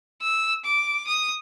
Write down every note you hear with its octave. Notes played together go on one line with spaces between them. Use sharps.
E6
D6
D#6